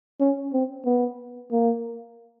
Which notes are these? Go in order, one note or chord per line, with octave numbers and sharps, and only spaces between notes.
C#4
C4
B3
A#3